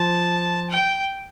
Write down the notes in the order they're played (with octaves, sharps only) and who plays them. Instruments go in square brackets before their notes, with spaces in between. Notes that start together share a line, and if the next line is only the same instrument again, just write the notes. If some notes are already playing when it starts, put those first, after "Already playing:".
Already playing: [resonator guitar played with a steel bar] F3 [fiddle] A5
[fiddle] G5